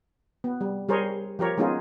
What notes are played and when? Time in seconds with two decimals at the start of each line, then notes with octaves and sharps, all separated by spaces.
0.44 B3
0.61 G3
0.89 G3 G#4 A#4 C5 C#5
1.39 F3 G4 A#4 C#5
1.58 G#3 B3 C#4 D#4 F4 G#4